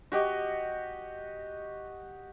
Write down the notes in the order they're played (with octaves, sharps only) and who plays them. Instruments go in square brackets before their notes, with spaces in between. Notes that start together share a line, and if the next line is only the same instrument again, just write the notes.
[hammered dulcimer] F#4 G4 D#5